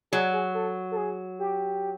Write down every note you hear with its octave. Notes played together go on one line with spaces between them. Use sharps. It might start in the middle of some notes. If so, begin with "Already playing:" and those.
F#3 G#4
G#4
A4
A4
G#4
G4